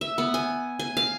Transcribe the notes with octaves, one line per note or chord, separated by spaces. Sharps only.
E5
B3
G#5
G#5
F5